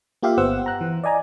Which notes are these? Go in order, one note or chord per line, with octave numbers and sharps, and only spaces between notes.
A#3 F4 G4 E5 F5
G1 B3 C5 F#5 E6
A#5 F#6
E3
D5 D#5 G#5 A#5